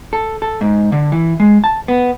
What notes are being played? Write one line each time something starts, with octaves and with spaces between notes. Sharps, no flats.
A4
A4
G#2
D3
E3
G#3
A5
B3